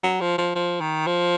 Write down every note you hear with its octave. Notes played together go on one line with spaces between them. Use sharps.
F#3
F3
F3
F3
D#3
F3